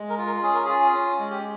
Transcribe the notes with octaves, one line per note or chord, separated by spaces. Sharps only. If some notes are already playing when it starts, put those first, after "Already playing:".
Already playing: G#3
A#4
F4
A#4
C#4 G#4
A#4
F4 G#4
C#4
G#3
G4